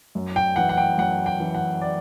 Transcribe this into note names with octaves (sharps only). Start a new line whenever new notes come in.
F#2
G5
E3 F#5
F#5
G5
F#2 F#5
G5
E3
F#5
D5